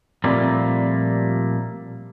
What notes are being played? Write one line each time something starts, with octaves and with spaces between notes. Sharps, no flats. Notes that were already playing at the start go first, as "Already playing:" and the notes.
A#2 F3 G3 A3 A#3 C4